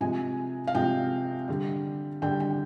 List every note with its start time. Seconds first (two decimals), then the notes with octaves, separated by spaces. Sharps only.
0.01 C3 F3 G#3 G#5
0.67 F5
0.75 C3 F3 G#3 G5
1.48 D3 G3
2.22 D3 G3 G5
2.40 G5